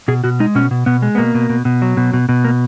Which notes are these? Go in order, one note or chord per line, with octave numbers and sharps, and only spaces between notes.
B2 G#4
B2 F#4
G#3 D#4
B2 C#4
B2
B2 B3
G#3
B3
B2 A#3
B2
B2
B2
F#3
B2
B2
B2
A#3